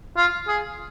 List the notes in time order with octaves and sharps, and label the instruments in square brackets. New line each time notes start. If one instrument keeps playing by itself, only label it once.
[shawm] F4
G#4